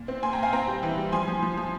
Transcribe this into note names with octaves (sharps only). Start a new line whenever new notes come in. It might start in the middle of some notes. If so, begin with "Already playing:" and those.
Already playing: A#2
C4
A#2 G#5 C6
G5 A#5
A#2 F5 G#5
C4 G5 A#5
G3
E3
G3
F3 G#5 C6
F3
F3
F3